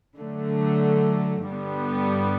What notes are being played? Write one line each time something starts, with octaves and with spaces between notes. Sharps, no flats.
D3 F#3 A3
G2 D3 G3 B3